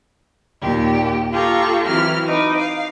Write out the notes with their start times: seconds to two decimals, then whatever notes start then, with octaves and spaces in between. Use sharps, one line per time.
0.61 D#2 A#2 G4
1.31 F4 G4 A4 A#5 C#6
1.85 E3 F#3 C4 F6
2.26 D#4 B4 D6
2.57 F5